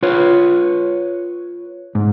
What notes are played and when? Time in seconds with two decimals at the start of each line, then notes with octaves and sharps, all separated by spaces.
0.03 F4 B4 C#5
1.95 G#2